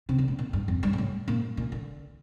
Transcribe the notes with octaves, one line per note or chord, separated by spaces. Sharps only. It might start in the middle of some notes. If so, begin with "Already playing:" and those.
C3
D3
A#2
A#2
G2
F2
G2
A#2
A2
A#2
A#2
D3